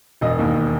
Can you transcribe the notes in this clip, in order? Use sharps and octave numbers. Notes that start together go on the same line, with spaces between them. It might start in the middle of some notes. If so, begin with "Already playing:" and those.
E1 D#5
D#2 D#3